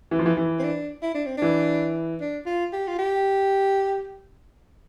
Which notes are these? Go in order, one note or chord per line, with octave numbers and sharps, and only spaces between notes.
E3
F3
E3
E3
C4
D4
E4
D4
C4
E3 D4
D4
F4
G4
F4
G4